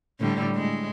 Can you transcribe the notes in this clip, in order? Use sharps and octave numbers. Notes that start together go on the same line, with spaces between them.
A2 D3 G3
A2 G#3